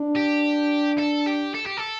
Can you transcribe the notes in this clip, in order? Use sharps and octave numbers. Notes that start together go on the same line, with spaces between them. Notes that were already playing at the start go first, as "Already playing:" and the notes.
Already playing: D4
G4
A4
G4
A4
G4
A4